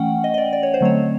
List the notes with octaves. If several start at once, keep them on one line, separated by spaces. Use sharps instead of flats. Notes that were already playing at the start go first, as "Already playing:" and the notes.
Already playing: E3 A3 C#4 F#5 G5
D#5
D#5
D5
D5
C#5
C5
D3 F#3 A3 C4 C#5